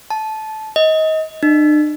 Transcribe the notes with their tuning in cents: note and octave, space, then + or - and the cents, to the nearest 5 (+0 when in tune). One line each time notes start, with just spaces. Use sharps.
A5 -15
D#5 +25
D4 +45